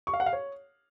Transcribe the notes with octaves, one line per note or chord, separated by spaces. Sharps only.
C#6
F5
F#5
F5
C#5